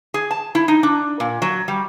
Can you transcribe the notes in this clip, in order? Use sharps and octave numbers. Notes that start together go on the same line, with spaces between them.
G#4
A5
E4
D#4
D4
A#2
F#3
G3